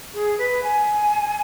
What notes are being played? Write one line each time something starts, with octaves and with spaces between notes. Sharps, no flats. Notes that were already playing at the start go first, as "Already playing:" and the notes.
G#4
B4
G#5